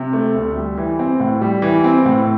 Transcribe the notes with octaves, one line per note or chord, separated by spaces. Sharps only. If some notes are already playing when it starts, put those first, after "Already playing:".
Already playing: C3
A3
D2
G3
E3
C4
A2
G3
E3
C4
A2